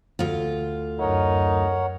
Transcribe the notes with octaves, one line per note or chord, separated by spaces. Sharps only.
D2 F4
F#2 D#4 A#4 C#5 F#5